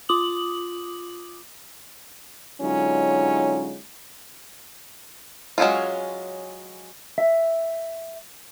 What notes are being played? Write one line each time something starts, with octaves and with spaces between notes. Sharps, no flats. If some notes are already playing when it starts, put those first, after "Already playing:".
F4 D6 D#6 F#7
D3 F#3 G#3 C#4 D#4 F4
F#3 G#3 C4 C#4 F4
E5